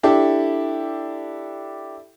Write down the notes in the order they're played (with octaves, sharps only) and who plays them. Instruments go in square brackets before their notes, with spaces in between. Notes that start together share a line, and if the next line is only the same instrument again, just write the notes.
[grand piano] D4 E4 G4 A4